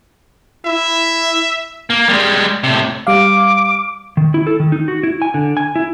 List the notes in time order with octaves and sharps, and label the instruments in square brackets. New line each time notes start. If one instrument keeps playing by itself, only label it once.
[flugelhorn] E4 [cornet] E5
[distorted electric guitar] A#3
G3 G#3
A2 C3
[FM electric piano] G3 F5 [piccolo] D6
[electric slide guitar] D#3
E4
A4
D#3
D#4
F#4
E4
G#5
D3
G#5
E4